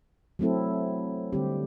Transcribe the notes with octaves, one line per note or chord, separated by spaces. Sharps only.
F#3 A3 C4 E4 A4
D3 G3 C4 G4